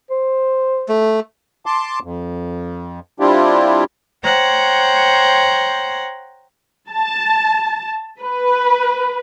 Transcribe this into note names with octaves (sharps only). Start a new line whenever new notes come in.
C5
A3
A5 C6 D6
F2
G3 C4 D4 E4 F4 G4
C5 C#5 F#5 G5 A#5
A5
B4